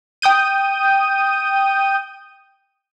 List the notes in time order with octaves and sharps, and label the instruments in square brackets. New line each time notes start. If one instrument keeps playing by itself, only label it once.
[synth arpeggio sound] G5 D#6 G6 D#7